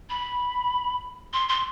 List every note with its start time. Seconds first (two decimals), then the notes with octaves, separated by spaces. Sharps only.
0.10 B5
1.33 C6
1.49 C6